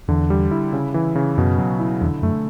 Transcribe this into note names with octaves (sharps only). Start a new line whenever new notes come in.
E2 D3
G3
E4
C#3
E3
C#3
F#2 B2
F#3
E4
E2 D3
F#2 A3